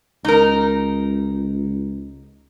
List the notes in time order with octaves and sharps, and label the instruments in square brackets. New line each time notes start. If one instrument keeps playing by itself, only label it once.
[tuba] C#2 [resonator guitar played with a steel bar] D#4 A#4